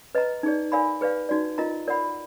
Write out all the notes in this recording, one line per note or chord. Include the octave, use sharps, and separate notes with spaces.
B4 D#5 A#5
D#4 G#4 D5
A#4 D5 F5 G#5 B5
G#4 B4 D5 F5
D#4 F#4 D5
F4 A#4 D#5 A#5
A#4 D5 F#5 B5